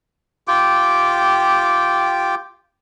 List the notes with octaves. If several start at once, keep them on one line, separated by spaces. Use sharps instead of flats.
F4 G4 G5 D6